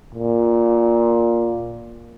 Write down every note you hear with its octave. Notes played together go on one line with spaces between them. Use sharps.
A#2